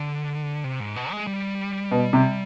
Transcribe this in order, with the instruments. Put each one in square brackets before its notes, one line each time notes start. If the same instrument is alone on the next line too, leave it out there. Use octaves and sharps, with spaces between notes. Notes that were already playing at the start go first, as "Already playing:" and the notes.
Already playing: [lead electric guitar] D3
C3
G#2
B2
G#3
G3
[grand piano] B2
C3